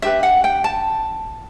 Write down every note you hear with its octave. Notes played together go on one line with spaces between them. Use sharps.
D4 G4 B4 E5
F#5
G5
A5